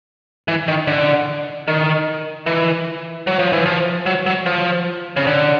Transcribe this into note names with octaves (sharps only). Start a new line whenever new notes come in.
E3
D#3
D3
D#3
E3
F#3
F3
E3
F3
F#3
F#3
F3
C#3
D3